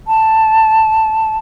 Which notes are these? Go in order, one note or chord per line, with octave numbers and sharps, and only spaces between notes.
A5